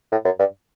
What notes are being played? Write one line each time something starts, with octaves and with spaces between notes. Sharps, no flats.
A2
F#2
G2